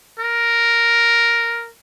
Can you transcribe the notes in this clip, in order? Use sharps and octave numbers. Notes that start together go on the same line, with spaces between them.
A#4